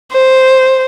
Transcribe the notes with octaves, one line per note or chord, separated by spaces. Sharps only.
C5